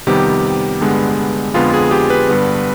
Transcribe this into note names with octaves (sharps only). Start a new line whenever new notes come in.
F2 C3 D#3 G3 B3 G4
G2 D3 G#3 B3
F2 D3 G#3 B3 F4
G#4
G4
B4
G2 D3 G3 B3